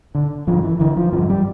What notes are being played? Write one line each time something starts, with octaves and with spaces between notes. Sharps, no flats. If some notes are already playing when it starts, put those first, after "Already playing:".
D3
G2 F3
E3
D3 E3
F3
G2 F3
G3